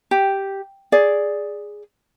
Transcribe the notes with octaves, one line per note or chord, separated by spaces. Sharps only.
G4
G#4 D5